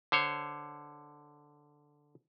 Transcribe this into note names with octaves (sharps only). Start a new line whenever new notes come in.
D3 C5 C#5